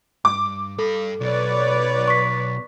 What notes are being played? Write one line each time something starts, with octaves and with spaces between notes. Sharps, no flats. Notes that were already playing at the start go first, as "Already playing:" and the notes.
G2 D6
G2 A4 B5
B1 B4 C#5 D5
C#6 B6